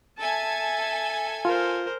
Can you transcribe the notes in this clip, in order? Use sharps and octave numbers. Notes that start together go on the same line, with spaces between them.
A4 E5 G#5 A5
F4 A#4 C5